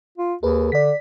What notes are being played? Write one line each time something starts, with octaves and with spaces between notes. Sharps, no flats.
F4
D#2 G#4 A#4 B4
D3 D5 B6